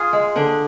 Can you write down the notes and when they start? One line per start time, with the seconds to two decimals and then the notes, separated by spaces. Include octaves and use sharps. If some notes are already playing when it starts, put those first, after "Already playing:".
Already playing: F4 G#4
0.13 G#3
0.36 D3 D4